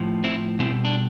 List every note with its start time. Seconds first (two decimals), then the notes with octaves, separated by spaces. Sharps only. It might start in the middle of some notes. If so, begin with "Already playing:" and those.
Already playing: A2 F3
0.24 C4 E4
0.59 B2 G3 C4 E4
0.85 D4